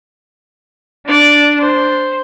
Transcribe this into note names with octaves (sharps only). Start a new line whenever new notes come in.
D4 D5
C5